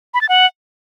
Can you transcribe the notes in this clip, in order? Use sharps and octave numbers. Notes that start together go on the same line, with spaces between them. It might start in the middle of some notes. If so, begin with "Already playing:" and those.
B5
A6
F#5